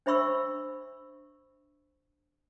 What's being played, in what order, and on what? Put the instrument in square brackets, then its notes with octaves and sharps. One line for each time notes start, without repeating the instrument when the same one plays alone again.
[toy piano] D4 C5 E5 B5 C#6 E6